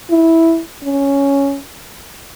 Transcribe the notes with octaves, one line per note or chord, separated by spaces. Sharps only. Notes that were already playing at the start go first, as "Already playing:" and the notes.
E4
C#4